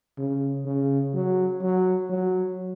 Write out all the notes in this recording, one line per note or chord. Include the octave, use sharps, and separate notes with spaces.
C#3
C#3
F#3
F#3
F#3